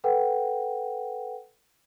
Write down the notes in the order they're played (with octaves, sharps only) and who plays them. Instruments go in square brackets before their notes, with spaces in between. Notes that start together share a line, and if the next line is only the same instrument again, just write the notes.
[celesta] A4 B4 F#5 G5